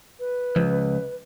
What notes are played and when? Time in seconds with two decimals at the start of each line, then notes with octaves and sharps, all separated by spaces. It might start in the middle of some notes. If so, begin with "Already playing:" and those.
0.20 B4
0.56 C#2 F3